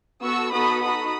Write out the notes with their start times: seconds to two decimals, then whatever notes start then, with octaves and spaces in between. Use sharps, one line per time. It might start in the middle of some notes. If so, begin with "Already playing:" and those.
0.23 B3 F#4 A4 C#6 E6
0.52 B3 D#4 F#4 A4 B5 D#6
0.82 D#4 F#4 A4 B5 D#6